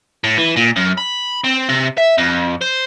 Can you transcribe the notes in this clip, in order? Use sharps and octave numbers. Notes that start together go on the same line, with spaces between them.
A2
E3
A#2
F#2
B5
C4
C3
E5
F2
C5